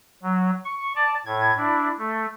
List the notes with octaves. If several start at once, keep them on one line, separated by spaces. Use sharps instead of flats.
F#3
C#6
D5 A5
A2 G#6
D4 E4
A3